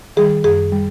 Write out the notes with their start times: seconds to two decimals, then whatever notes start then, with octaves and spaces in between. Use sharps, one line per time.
0.17 D#3 G3 G#4
0.44 F#2 G#4
0.72 G3